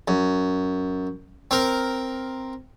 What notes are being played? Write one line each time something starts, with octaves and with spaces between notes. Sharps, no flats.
F#2
C4 A#4